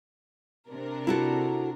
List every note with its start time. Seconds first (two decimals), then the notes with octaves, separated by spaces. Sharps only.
0.71 C3 D4 A#4
1.07 E4 F#4 A4